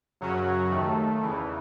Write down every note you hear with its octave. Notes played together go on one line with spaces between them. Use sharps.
F#2 C#3 F#3 C#4 F#4
D#2 D#3 A3
E2 C#3 E3